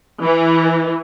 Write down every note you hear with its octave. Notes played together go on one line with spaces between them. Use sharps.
E3